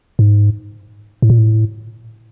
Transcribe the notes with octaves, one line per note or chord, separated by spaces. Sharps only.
G#2
A2
A#2
A2